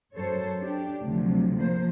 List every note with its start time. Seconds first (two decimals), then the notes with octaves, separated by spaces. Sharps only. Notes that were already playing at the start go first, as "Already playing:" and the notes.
0.16 F#2 A4 C5 C#5
0.61 D4 G4
1.03 D2 C3 F3 F#3
1.56 F3 A#3 C5